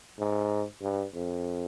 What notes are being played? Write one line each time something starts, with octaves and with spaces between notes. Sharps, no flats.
G#2
G2
F2